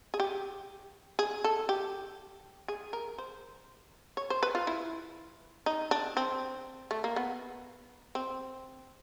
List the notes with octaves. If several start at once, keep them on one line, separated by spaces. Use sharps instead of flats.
G#4
G4
G#4
A4
G4
G#4
A#4
C5
C#5
C5
B4
F4
E4
D#4
D4
C4
A3
A#3
B3
C4